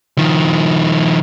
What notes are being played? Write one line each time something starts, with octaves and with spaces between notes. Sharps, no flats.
D#3 F3